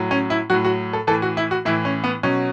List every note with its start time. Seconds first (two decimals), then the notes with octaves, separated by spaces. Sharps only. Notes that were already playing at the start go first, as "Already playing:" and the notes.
Already playing: A2 F#3
0.11 C#4
0.30 E4
0.50 A2 F#3 F#4
0.65 F#4
0.93 A4
1.07 E3 A4
1.11 A2
1.22 F#4
1.37 E4
1.51 F#4
1.65 A2 E3 E4
1.85 C#4
2.04 B3
2.23 B2 F#3 C#4